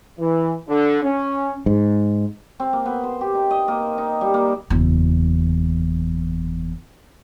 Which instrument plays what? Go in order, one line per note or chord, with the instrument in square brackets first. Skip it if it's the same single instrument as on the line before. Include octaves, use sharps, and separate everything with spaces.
[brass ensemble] E3
D3
C#4
[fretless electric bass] G#2
[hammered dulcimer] C4
A#3
B3
C5
G4
D#4
D#5
A#3
D#4
G3
A#3
[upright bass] F#1 E2